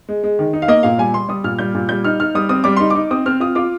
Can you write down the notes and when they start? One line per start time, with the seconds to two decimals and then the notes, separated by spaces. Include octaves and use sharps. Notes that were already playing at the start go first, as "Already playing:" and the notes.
0.09 G#3
0.24 G#3
0.39 D#3
0.53 D#4
0.62 F5
0.68 A#3 D#5
0.83 A#2 F5
0.98 G3 G#5
1.13 G3 C6
1.29 G3 D#6
1.44 A#2 F6
1.59 G3 G6
1.75 A#2
1.89 G3 G6
2.04 D#4 F6
2.20 D#4 F6
2.35 G3 D#6
2.49 C4 D#6
2.64 G3 D6
2.77 D#4 C6
2.90 D#4 D6
3.11 C4 D#6
3.26 C4 F6
3.40 F4 D#6
3.55 F4 D6